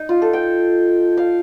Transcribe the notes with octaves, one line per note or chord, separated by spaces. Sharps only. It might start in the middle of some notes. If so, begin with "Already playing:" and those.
Already playing: D#4
F4
A4
G5
F5